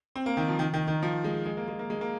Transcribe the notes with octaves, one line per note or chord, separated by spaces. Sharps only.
C4
A#3
D#3
F3
D#3
D#3
D#3
F3
G#3
G#3
A#3
G#3
A#3
G#3
A#3